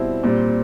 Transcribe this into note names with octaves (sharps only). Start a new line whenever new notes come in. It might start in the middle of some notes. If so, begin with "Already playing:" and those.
Already playing: B2 G3 C4 E4
A#2 G3 C4